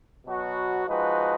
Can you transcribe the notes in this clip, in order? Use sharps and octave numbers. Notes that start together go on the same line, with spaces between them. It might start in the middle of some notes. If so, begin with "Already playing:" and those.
B2 F#3 B3 F#4
F3 G#3 D#4 F#4 B4